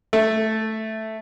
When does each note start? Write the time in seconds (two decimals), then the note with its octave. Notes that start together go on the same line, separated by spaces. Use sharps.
0.13 A3